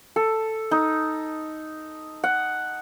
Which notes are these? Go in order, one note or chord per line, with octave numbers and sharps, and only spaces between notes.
A4
D#4
F#5